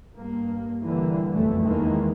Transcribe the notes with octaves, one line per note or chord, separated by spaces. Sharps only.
G2 A#3
D3 E3 G3 A#3
F#1 B1 F2 E3 A3
E2 D#3 E3 G#3 A#3